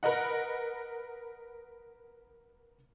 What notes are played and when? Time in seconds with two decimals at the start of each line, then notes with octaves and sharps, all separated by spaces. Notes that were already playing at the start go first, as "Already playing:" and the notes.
0.03 A#4 B4 D#5 F#5